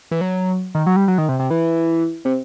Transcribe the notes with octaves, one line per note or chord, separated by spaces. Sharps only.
E3
F#3
D#3
F#3
G3
F#3
D#3
C3
C3
E3
C3